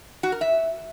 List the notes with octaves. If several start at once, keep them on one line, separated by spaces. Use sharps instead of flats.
F#4
A#4
E5